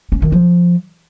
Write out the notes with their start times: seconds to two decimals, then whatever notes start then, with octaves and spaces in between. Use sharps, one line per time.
0.12 C#4
0.22 D#3
0.32 F3